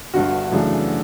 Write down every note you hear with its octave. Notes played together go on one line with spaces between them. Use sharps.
G1 G2 D3 F#4
F#2 C#3 E3 A3 D4